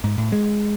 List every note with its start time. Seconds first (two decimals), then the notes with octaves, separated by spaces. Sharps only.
0.04 G#2
0.18 A2
0.32 G#3